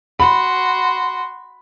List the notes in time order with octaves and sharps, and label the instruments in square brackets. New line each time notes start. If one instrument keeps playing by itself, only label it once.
[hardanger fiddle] F#4 C6 [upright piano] B5